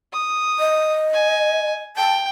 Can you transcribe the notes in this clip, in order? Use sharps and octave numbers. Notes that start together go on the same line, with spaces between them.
D#6
D#5
G#5
G5 A5